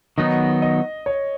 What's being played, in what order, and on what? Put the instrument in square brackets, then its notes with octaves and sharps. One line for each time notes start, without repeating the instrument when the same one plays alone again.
[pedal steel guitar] D#3 F#3 B3 D#4 [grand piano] D#5
[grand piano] D#5
C#5